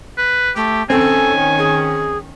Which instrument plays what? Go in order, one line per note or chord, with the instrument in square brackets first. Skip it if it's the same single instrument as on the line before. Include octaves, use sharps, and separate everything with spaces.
[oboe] B4
[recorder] A3 [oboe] G4
[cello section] D#3 C#4 [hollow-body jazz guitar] C4 [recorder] A4 [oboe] G#5
[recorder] G#4